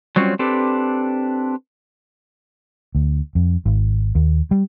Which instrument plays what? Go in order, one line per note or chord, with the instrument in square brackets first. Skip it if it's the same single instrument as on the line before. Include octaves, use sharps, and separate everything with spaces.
[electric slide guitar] F#3 G3 C4 C#4 F4
C4 D4 G4 A4 B4
[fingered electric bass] D2
F2
G#1
D#2
G3